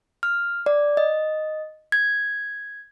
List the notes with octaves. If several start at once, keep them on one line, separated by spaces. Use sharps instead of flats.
F6
D5
D#5
G#6